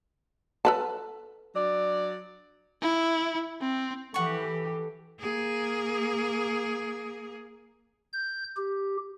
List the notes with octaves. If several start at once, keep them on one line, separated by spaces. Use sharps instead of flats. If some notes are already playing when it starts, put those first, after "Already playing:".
A4 B4 A5
F#3 D4 D5
E4
C4
E3 G4 A4 F#5 C#6
A#3 G#4
G6
G4